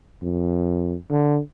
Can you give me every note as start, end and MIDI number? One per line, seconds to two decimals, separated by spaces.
0.22 0.97 41
1.10 1.39 50